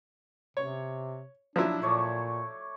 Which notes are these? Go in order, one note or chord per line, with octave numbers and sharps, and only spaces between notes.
C3 C#5
F3 F#3 D4 E4
A#2 A3 C#5 D5